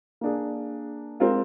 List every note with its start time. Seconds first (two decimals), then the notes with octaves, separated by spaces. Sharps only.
0.21 A#3 D4 G#4
1.20 G#3 C4 F4 A#4